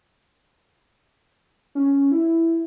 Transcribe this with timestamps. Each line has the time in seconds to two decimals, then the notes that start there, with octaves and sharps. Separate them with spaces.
1.75 C#4
2.11 E4